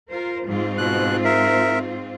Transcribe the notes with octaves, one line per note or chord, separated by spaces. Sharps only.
F4 A#4 C5
G#2 C4 F4
B2 F#6
A#4 E5